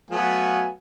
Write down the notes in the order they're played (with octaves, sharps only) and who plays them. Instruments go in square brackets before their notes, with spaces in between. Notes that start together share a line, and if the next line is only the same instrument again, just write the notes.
[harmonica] F#3 A3 B3 [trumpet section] F5 G#5